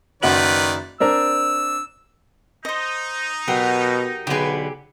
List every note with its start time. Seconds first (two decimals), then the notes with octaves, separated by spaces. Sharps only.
0.23 F#1 D#3 F#4 B4 D5 F#7
1.00 C4 D4 A#4 E6
2.65 D#4 C5 D#5
3.48 B2 F#3 G4 A#4 F#5
4.27 B1 D3 G4 G#4 B4